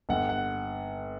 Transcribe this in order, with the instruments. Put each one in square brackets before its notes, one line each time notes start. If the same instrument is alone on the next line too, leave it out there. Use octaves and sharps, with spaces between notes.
[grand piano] G1 F#5
F#5